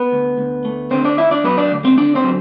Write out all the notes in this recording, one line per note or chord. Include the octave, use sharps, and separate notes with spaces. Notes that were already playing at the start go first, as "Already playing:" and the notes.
Already playing: B3 B4
D2
D2
A3
D3 C4 C5
D4 D5
D2 E4 E5
D4 D5
F#3 B3 B4
D4 D5
D2
C4 C5
D3 D4 D5
C4 C5
F#3